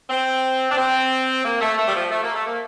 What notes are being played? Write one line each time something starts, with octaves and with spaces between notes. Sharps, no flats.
C4
D4
C4
A#3
A3
A3
G3
F3
A3
A#3
A3
A#3